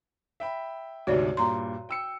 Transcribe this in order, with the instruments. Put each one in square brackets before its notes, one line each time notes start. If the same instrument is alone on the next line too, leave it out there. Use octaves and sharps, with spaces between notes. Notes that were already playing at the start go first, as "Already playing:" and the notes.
[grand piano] E5 G5 B5
[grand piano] D2 G#2 C3 [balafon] F#4 C#5 D5
[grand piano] G2 A#2 [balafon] A#5 C6
[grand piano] G5 E6 C#7